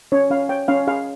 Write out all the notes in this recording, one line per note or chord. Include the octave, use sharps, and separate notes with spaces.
C#4 C#5
C#4 F5
C#5 G5
C#4 F5
G#4 F5